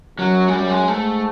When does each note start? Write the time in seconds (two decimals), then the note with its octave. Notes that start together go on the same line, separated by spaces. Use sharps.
0.18 F#2 F#3
0.48 G#3
0.52 F#2 G3
0.70 G#3
0.87 G#2 A3